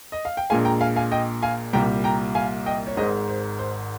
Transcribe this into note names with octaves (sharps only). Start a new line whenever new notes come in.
D#5
F5
G5
A#1 A#2 G#3 F5 G#5
G5 A#5
F5 G#5
F5 G#5
D#5 G5
F5 G#5
C2 A#2 G3 G5 A#5
G5 A#5
F5 G#5
D#5 G5
C#5
G#1 G#2 D#3 G#3 C5 D#5
C5
C5